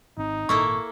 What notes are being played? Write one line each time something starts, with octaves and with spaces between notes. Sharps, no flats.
G#1 C4 D#4
G#1 A#2 A#3 E4 A4 C#6